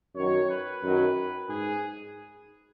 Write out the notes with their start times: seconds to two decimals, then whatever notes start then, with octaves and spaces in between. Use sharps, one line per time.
0.15 F#2 D#3 F#3 C#5
0.49 B4
0.83 F#2 D#3 F#3
1.49 G#2 G#4